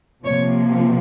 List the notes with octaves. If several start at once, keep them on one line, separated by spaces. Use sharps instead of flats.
C3 F3 A#3 C#5